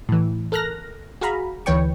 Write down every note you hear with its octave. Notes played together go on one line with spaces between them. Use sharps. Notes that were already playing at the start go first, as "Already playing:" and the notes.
A2 E3
A4 A#4 F6 F#6 A#6
F#4 G#4 F5 A#5 B5
D2 E3 B4 C#5 G5 C#6